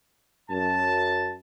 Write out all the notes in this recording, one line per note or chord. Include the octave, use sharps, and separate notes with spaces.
F#2 A5